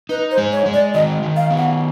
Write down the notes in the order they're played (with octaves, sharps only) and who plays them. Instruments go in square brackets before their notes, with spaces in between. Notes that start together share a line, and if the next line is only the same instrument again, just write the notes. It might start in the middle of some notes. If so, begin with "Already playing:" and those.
[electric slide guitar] D#4 [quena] B4
[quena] C5
[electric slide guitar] G#3
[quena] C#5
[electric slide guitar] G#3
[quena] D5
[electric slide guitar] D#3 [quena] D#5
[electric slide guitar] D#3
[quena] F5
[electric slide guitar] B3
[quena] F#5